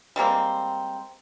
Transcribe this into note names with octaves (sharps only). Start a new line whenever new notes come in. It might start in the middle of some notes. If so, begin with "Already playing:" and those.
G3 G#3 A#3 C4